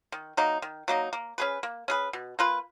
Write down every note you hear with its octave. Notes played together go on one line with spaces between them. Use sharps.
D#3
F#3 A#3 D#4
D#3
F#3 A#3 D#4
A#3
C#4 G#4 B4
A#3
C#4 G#4 B4
B2
A#3 F4 B4